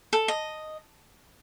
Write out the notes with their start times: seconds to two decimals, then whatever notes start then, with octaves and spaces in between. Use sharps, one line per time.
0.13 A4
0.28 D#5